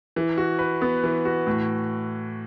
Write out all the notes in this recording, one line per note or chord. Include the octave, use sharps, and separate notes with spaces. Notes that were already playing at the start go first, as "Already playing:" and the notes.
E3
F#4
B4
B3
E3
F#4
A2